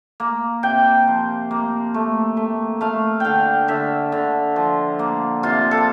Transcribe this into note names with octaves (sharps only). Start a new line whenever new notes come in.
A#3
C3 G5
F3
A#3
A3
A3
A3 F5
D3 F5 G5
D3 E5
D3
F3
A#3
C3 F4
A4